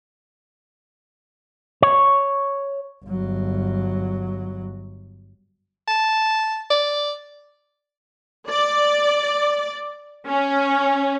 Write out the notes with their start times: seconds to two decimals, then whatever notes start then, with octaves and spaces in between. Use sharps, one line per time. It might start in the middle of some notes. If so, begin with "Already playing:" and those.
1.82 C#5
3.05 G1 F#3
5.88 A5
6.71 D5
8.49 D5
10.28 C#4